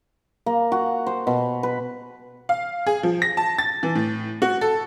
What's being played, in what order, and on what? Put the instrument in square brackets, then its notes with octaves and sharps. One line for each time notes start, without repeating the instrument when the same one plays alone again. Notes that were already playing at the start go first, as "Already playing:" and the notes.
[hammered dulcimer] A#3
F#4
C5
B2
B4
[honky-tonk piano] F5
G#4
F3
A#6
A5
A6
E3
A2
F#4
A4